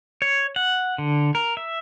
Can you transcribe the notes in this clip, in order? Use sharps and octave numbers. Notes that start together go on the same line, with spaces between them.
C#5
F#5
D3
A#4
E5